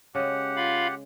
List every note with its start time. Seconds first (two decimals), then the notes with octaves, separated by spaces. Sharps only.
0.15 C#3 G#3 G4 F#5
0.56 F4 F5 B5